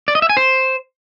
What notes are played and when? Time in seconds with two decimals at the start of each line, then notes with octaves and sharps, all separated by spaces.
0.08 D5
0.15 D#5
0.22 E5
0.29 G#5
0.37 C5